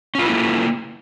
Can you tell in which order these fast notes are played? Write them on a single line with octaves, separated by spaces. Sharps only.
C#4 F4 B4 E4 A#3